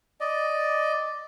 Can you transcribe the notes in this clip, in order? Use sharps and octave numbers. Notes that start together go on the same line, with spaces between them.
D5 D#5